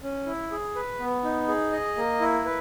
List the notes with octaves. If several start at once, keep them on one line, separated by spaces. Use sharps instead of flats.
C#4
E4
G#4
B4
B3
D#4
G#4
D#5
A#3
E4
B4